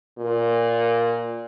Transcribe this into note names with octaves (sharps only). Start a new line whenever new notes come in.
A#2